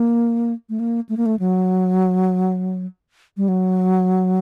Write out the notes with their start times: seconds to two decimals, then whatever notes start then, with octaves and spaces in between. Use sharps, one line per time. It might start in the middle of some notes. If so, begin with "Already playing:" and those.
Already playing: A#3
0.69 A3
0.80 A#3
1.09 A3
1.17 A#3
1.26 A3
1.39 F#3
3.37 G3
3.48 F#3